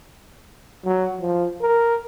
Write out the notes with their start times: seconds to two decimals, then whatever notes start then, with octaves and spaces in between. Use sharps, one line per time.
0.85 F#3
1.20 F3
1.61 A#4